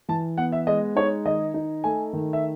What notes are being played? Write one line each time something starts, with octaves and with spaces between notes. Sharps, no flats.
E3 A5
B3 F#5
E5
G#3 D#5
D#4 C#5
D#3 D#5
D#4
A3 G#5
D#3
E5